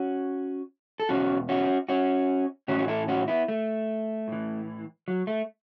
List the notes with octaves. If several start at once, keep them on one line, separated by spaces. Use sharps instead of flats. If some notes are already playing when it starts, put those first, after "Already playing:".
Already playing: C#4 F#4
A4
E2 B2 C#4 F#4
C#4 F#4
C#4 F#4
A2 E3 C#4 F#4
F#4
E4 A4
C#4 F#4
B3 E4
A3
A2 E3
F#3
A3